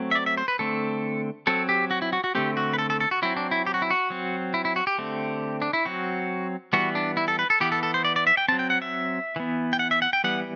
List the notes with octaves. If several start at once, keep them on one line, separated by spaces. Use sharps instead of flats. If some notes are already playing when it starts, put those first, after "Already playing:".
Already playing: F#3 A3 C4
E5
D5
E5
C5
B4
D3 A3 C4 A4
F#3 C4 A4
G4
F#4
E4
F#4
F#4
D3 A3 C4 G4
F#4
B4
A4
A4
A4
F#4
F#3 C4 E4
D4
E4
G4
F#4
E4
F#4
F#3 C4
E4
E4
F#4
G4
D3 A3 C4
D4
E4
F#3 C4 F#4
E3 G3 B3 F#4
D4
E4
A4
B4
A4
E3 B3 G4
A4
A4
C5
D5
D5
E5
G5
F#3 C4 A5
G5
F#5
E5
E3 B3
G5
F#5
E5
F#5
G5
E3 G3 B3 F#5